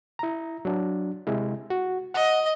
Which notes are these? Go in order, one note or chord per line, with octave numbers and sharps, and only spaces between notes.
E4 A#5
F#3 D4
C3 G#3 E4
F#4
D#5 F#5